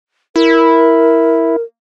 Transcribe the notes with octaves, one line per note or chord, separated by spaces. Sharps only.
E4 A#4